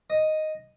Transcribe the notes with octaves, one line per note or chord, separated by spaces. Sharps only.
D#5